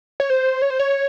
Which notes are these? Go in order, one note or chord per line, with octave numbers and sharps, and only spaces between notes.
C#5
C5
C#5
C5
C#5